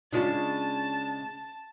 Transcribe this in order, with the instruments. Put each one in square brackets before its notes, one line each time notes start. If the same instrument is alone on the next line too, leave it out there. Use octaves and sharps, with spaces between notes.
[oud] C#3 G#3 C#4 [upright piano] D4 F4 A6 [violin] A5